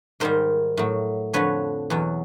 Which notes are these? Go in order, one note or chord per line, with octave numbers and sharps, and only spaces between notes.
G#2 D#3 G3 A#4 C5
A2 F#3
F2 D3 F3 B4 C#5
E2 B2 F#3